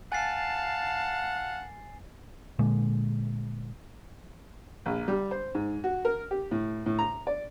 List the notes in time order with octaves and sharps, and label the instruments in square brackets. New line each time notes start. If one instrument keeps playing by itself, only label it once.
[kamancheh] F5 A5 [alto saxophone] F#5 [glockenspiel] G#5 A6 C7
[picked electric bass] A#2 D3 G#3
[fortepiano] A#1
G3
C5
G#2
F#4
A#4
G4
A2
A2
A#5
D5